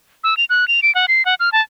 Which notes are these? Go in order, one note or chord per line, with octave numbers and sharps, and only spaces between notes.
E6
F7
F#6
F7
D7
F#5
C7
F#5
F6
A5